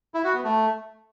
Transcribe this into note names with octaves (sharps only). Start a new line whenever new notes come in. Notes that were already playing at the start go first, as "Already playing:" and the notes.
E4
F#4
B3
A3